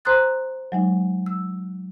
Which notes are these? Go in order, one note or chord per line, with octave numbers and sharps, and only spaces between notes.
C5 A#5 C6 D#6 F#6 A6
F#3 G#3 D#4
E6